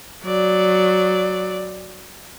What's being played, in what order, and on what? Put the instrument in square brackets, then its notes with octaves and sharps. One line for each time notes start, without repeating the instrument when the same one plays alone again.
[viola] F#3 D5